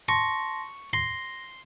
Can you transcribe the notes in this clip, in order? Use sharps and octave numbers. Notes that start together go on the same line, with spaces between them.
A5 C6 C#6 A#6
C6 A#6